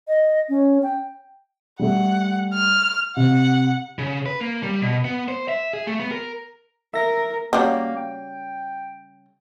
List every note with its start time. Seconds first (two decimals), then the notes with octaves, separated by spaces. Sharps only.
0.08 D#5
0.49 C#4
0.83 G5
1.79 G3 A3 F#5
2.53 F6
3.17 C3 F#5
3.99 C#3
4.26 B4
4.41 A#3
4.63 G3
4.82 B2
5.05 B3
5.28 C5
5.48 E5
5.73 G#4
5.87 A3
6.00 B3
6.12 A#4
6.94 A#4 E5 A#6
7.53 C#3 F#3 G3 A#3
7.96 G5